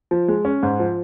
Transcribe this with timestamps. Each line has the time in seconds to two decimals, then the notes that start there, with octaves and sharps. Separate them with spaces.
0.11 F3
0.28 G#3
0.45 C#4
0.63 G#2
0.79 F3